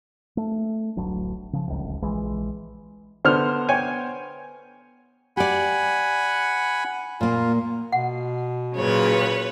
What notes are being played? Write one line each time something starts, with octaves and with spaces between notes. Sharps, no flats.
A3
D1 A1 F#3 D4
C#3 F3
D1 G#1 C#2
A#1 E3 G#3
D3 B3 C5 F6
C#5 G5 G#5
G4 D5 F#5 G#5 B5
A#2 A#3 F4
B2 F#5
A#2 C#3 F#3 B4 C#5